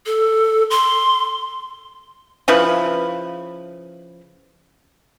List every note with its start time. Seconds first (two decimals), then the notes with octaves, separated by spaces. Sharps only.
0.06 A4
0.70 C6
2.48 C#3 F3 E4 B4